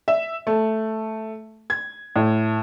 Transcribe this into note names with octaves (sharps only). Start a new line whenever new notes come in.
E5
A3
G#6
A2